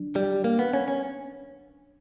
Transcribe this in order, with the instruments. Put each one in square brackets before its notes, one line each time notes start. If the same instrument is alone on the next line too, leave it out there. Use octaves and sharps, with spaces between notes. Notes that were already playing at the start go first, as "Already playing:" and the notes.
Already playing: [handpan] F#3 D4
[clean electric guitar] G3
A#3
B3
C#4
C#4